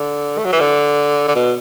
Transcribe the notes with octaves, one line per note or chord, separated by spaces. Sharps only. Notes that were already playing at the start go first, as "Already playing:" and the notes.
Already playing: D3
A3
F#3
E3
D3
D3
B2